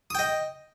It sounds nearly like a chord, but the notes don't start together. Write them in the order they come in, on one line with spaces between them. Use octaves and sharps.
D#6 G5 D#5